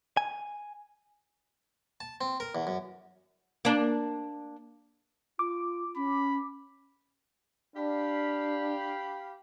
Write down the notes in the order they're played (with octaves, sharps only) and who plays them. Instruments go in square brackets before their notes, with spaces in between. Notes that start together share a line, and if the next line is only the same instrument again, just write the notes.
[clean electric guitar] G#5
[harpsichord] A5
C4
A#4
E2
F#2
[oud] A#3 D4
[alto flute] F4 [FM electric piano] D6
[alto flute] C#4 [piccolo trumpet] B5
[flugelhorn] D4 [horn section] G4 F5 B5